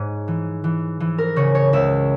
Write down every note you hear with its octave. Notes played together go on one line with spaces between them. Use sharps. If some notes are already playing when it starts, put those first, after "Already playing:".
Already playing: G#2 C#5
E3
E3
E3
A#4
C#3 C#5
C#5
C#2 E5